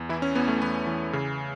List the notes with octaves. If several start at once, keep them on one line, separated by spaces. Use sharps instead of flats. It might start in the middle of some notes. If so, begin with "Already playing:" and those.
Already playing: E2
E3 E4
C#4
E2 B3
A3
E2 B3
E3
C#3